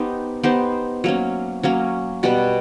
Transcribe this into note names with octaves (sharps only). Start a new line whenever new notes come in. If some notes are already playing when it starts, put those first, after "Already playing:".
Already playing: B3 D#4 G4 C5
B3 D#4 G4 C5
F#3 A#3 C#4
F#3 A#3 C#4
B2 G3 B3